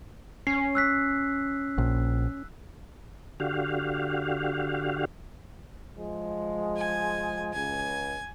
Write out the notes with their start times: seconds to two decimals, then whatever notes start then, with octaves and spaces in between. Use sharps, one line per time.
0.47 C#4 C7
0.75 E6 F#6 B6
1.78 A#1
3.40 D3 F#4 G4 F5
5.95 F3 G#3
6.77 G#5
7.53 C#2 G#5